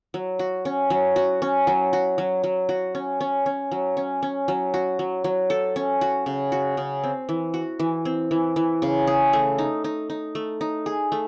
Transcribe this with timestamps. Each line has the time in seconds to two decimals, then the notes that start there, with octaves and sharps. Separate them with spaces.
0.14 F#3
0.39 F#4
0.65 C#4
0.90 F#3
1.16 F#4
1.42 C#4
1.67 F#3
1.93 F#4
2.18 F#3
2.44 F#3
2.69 F#4
2.95 C#4
3.21 C#4
3.46 C#4
3.71 F#3
3.97 C#4
4.23 C#4
4.48 F#3
4.74 F#4
4.99 F#3
5.24 F#3
5.50 A4
5.76 C#4
6.01 F#4
6.26 C#3
6.52 F#4
6.77 C#3
7.04 C4
7.29 E3
7.54 F#4
7.79 E3
8.05 C4
8.31 E3
8.56 E3
8.82 C#3
9.07 G#4
9.33 A3
9.58 D#4
9.84 D#4
10.10 D#4
10.35 A3
10.61 D#4
10.86 G#4
11.12 A3